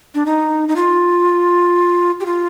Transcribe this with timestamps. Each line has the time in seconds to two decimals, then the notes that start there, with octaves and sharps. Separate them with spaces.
0.15 D4
0.26 D#4
0.68 D#4
0.76 F4
2.20 G4
2.26 F4